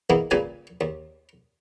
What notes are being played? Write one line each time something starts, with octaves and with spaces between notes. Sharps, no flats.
E3 G#3 A#3 B3 E4
A#2 C#3 G3 A#3 B4 G#5
D#2